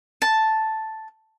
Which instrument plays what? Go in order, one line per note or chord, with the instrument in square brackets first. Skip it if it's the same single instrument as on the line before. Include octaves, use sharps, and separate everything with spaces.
[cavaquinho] A5